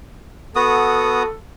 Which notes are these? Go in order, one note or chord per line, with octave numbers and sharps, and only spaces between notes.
B3 F#4 A4 D#6